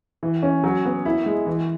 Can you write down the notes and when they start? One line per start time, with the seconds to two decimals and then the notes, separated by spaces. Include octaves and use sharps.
0.23 E3
0.43 C#4
0.64 F#3
0.85 B3
1.05 E4
1.26 G#3
1.46 E3